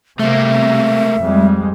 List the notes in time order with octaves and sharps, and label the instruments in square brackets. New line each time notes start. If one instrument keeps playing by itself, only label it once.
[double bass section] C3 [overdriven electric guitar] A3 A#3 [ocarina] E5
[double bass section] F2 G3 G#3